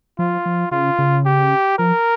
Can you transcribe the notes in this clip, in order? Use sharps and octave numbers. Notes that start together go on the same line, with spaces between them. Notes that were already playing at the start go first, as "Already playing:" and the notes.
F3 F4
F3
C#3 F4
C#3
G4
F3 A#4